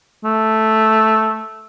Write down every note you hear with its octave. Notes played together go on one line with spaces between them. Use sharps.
A3